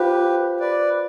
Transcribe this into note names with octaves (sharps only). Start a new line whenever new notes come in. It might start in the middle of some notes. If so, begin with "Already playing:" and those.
Already playing: F4 G4 B4 C5 F5
B4 D5